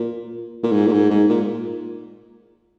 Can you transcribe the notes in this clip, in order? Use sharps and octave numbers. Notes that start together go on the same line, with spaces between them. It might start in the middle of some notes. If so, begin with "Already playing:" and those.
Already playing: A#2
A#2
G#2
A#2
G#2
G#2
A#2